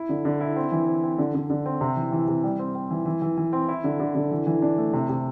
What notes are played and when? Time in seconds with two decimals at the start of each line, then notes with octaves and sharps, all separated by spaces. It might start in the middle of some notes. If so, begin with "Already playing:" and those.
Already playing: E4
0.09 D3
0.25 D3
0.41 E4
0.56 C4
0.72 E3
0.87 C4
1.03 C4
1.18 D3
1.35 D3
1.50 D3
1.66 C4
1.81 C3
1.96 E3
2.12 E3
2.28 C3
2.44 G3
2.59 C4
2.75 C4
2.91 E3
3.06 E3
3.22 E3
3.37 E3
3.53 C4
3.69 E4
3.84 D3
4.00 D3
4.15 D3
4.31 E3
4.47 E3
4.62 D4
4.78 A3
4.93 C3
5.09 C3